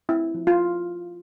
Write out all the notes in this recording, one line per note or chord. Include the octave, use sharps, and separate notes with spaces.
C4 E4
F3
F4